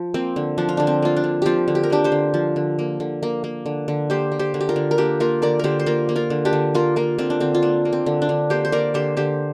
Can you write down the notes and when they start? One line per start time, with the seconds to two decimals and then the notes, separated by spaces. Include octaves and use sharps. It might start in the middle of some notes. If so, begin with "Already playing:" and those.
Already playing: F3
0.14 A#3 C4
0.36 D3
0.58 F3 D4
0.69 F4
0.77 D3 D4
0.87 C4
1.02 A#3 F4
1.16 D4
1.24 D3
1.42 F3 C4 F4 G4
1.68 D3
1.75 G4
1.83 A#4
1.90 A#3 D4 G4
2.04 G4 C5
2.12 D3
2.34 F3
2.56 D3
2.79 A#3
3.00 D3
3.23 A#3
3.44 A#3
3.66 D3
3.88 D3
4.10 A#3 G4 C5
4.32 A#3
4.39 G4 C5
4.54 D3
4.61 G4
4.69 F4 A#4
4.76 D3
4.91 A#4
4.98 A#3 D4 G4
5.20 A#3 F4 A#4
5.42 D3 A#4 D5
5.59 D3 G4 A#4 C5
5.80 C5
5.86 A#3 F4 A#4
6.09 A#3
6.16 F4 A#4
6.30 D3
6.45 D4 G4
6.53 D3
6.74 A#3 F4 A#4
6.96 A#3 F4 A#4
7.18 D3 C4 F4
7.30 D4
7.40 D3 C4
7.55 F4
7.62 A#3 D4
7.85 A#3
7.93 C4
8.06 D3
8.22 D4
8.29 D3
8.50 A#3 G4 C5
8.65 C5
8.72 A#3 A#4 D5
8.94 D3 G4 C5
9.17 D3 G4 C5